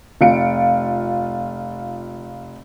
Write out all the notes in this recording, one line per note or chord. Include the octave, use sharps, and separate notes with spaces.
F1 F4 C#7 D7